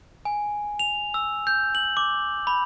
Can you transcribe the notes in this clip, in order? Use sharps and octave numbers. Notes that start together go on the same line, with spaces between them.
G#5
F7
E6
G6
F#7
D6
B5